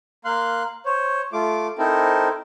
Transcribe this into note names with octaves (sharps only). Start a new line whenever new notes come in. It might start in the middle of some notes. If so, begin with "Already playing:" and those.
A#3 F5 C6 F#6
C5 C#5
A3 F4 D6
C4 D#4 E4 A4 A#4 C5